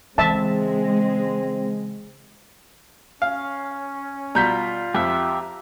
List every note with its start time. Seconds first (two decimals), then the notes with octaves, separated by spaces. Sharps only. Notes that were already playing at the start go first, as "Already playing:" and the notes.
0.18 C#3 E3 G#3 C4 E5 A5
3.22 C#4 F5
4.35 B2 G3 F4 A#5 G6 B6
4.95 F2 G4 E5